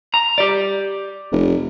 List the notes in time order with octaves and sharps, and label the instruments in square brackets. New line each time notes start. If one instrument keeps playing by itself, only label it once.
[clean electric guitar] A#5
G4 D5
[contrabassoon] F1